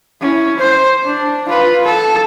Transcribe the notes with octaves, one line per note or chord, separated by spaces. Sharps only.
C#4 E4
C5
D4
F4 B4
A4